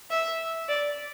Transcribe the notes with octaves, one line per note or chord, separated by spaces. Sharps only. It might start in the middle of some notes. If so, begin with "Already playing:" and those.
E5
D5